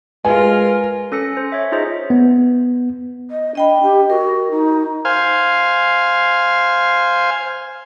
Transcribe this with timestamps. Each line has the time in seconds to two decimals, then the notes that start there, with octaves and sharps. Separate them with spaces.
0.25 G#3 F4 A#4 B4 G#5
1.12 C#4 A4 A#6 C#7
1.37 C5
1.52 C#5 E5
1.72 D#4 F4 G#4 C5 D#5
2.10 B3
3.31 D#5
3.55 D4 D#5 G5 B5
3.83 G4
4.10 F#4 A#4
4.51 D#4
5.05 C5 F5 G#5